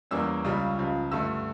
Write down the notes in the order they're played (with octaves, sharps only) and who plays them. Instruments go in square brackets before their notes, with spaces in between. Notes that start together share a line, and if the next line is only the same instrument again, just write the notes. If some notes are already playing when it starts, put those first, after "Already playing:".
[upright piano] E2 E3 G3 A#3 C#4 E6
C#2 C#3 G3 C#4
C#2 C#3 F3
G2 D3 A3 E6